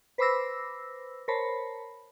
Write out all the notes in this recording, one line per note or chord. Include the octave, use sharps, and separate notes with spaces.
B4 C5 B5 D6 E6 A#6
A#4 C5 C#5 A5 B5